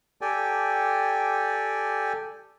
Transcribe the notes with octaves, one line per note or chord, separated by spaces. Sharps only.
G4 A4 D5 G5 G#5